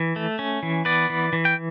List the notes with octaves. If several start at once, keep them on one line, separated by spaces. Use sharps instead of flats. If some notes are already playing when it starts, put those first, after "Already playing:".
Already playing: E3
A3
C#4
E3
B3 B4 D5
E3
E3
G5